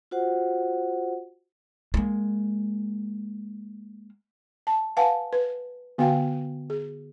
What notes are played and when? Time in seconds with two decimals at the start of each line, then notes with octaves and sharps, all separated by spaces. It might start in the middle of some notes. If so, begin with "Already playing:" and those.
0.11 F4 F#4 C5 F#5
1.94 G#3 A#3
4.67 A5
4.97 B4 F5 F#5 G#5 A5
5.33 B4
5.98 D3 B3 F#4 F5 G5
6.70 G#4